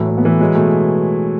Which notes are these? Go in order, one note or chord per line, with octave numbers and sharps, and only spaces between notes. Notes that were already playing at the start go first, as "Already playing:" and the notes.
Already playing: A2 E3 F#3 A3
A2
B3
E3 A3
F#3 G#3
B2 A3